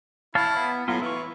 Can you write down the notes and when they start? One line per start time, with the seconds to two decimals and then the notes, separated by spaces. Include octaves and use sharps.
0.35 E4 C#5 F5 A5
0.57 B3
0.88 A2 F#3 B3 F4
1.02 E3 E4 C#6